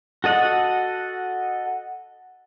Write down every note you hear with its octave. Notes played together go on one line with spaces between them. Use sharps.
F#4 A4 D#5 F#5